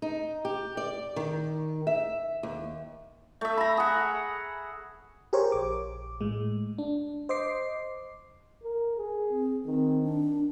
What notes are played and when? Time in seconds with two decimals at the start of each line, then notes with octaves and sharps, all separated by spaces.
0.02 D#4
0.45 G4
0.77 D5
1.16 D#3
1.87 E5
2.43 D#2
3.41 A3 E5
3.57 A#5 B5
3.77 G#4 F#5
5.33 G4 G#4 A#4 C5 C#5
5.52 A#1 D6
6.21 A2 G#3
6.78 D4
7.29 C5 D#5 D6 C7
8.63 A#4
8.97 G#4
9.30 C4
9.66 D#3 C4
10.03 D4